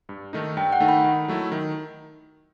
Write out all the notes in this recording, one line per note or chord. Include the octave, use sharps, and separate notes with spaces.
G2
D#3 A3 D#4
G2 G5
F#5
D#3 A3 D#4
B5
D#3
F#3 A3 E4
D#3